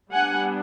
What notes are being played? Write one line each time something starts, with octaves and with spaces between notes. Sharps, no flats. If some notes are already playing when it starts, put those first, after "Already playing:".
G3 B3 D4 F#5 G#5